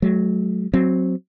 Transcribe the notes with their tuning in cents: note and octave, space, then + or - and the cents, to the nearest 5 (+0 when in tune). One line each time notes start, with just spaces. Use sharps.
F#3 +0 A3 -40
F#3 +0 C4 +0